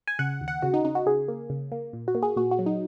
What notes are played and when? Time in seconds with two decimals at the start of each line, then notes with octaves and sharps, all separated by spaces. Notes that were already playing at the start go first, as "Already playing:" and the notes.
0.07 G#5
0.19 C#3 F#5
0.41 D#2
0.48 F#5
0.62 C#3 F#4
0.74 D#4
0.85 C#3 D#4
0.95 F#4
1.06 C#3 G#4
1.28 A#3
1.50 C#3
1.72 A#3
1.93 A#2
2.08 F#4
2.15 A#3
2.23 G#4
2.37 A#2 F#4
2.51 F#4
2.59 F#3
2.66 D#4